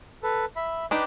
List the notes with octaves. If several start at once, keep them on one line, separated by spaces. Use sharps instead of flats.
A4 B4
E5 B5
D4 D#4 G4 B4 D6